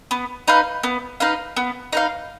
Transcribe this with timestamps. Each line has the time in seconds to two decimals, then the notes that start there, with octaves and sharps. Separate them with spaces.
0.11 B3
0.48 D#4 B4 F5
0.83 B3
1.20 D#4 B4 F5
1.56 B3
1.92 D#4 B4 F5